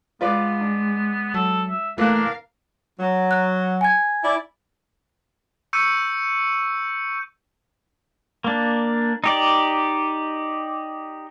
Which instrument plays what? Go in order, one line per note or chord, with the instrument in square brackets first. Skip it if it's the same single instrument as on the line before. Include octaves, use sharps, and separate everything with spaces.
[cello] G#3 [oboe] B3 [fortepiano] F4 B4 D5
[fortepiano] D4
[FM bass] F#3 [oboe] A4
[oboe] E5
[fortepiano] E3 A#3 F#6 [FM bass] A3 [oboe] D4 [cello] A#4 F5
[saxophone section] F#3
[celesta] F#6
G#5 G#6
[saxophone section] E4 D5
[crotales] C#6 E6 G6 C#7 D#7
[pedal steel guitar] A#3 D4
D#4 G4 D5